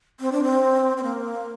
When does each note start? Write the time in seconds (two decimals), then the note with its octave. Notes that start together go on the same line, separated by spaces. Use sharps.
0.20 C4
0.32 D4
0.43 C4
0.97 C4
1.03 A#3